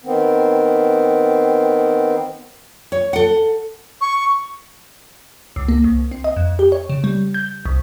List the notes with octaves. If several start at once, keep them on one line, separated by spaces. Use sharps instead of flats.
D#3 B3 C4
C#5
A4 F#5
C#6
C#2
A#3
C2
C4
D#5
F2
G4
C#5
C#3
G3
G6
C2